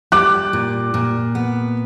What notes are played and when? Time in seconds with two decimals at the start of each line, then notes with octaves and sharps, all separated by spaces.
0.12 G3 D6 F#6
0.53 A#2
0.94 A#2
1.35 B3